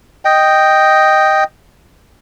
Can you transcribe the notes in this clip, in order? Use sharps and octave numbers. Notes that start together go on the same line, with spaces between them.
D#5 G5